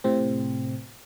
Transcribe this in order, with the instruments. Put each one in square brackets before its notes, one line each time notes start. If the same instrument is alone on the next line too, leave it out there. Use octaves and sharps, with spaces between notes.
[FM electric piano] A2 C3 C4